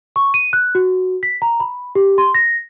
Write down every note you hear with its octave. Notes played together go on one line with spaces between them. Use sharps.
C#6
D#7
F#6
F#4
B6
A#5
B5
G4
C6
A#6